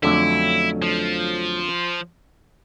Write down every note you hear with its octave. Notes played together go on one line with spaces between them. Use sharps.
F2 D3 F#3 A3 C#4 E4
F3